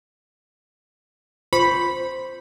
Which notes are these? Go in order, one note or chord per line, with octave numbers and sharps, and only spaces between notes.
F4 C5 B5